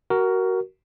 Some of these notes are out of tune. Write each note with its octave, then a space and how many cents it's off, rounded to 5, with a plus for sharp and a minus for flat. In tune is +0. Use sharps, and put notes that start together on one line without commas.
F#4 +20 A#4 +0